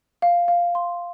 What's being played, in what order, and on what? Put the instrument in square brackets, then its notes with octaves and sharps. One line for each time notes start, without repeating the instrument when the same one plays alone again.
[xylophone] F5
F5
C6